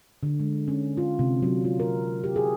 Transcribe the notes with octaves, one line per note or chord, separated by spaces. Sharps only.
D3
G#3
C#4
F4
C3
F#3
F4
A#4
G4
G#4